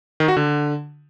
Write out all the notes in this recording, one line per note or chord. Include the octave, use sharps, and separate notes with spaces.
D#3
F#4
D3